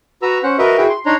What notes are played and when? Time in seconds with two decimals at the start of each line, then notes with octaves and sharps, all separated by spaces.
0.22 F#4 B4 A#5 E6
0.43 C#4 C5 F#5
0.59 F#4 A#4 B4 D#5 E5
0.78 E4 F#4 G#4 G5
0.90 C6
1.06 D4 D#4 C#5 A#5 C6